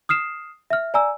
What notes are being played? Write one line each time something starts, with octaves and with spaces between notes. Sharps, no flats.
D#6 F6 C7 E7
E5 F6
D5 G#5 A#5 E6